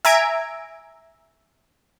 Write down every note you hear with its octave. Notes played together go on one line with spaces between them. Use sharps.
E5 G#5 A#5 G#6 D7